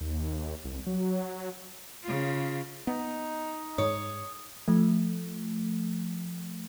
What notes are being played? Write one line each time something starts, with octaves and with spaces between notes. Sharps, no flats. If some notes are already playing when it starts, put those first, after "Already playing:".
D#2
C2
F#3
C#3 F4
B3 D#4
G#2 C#5 D#6
F3 A3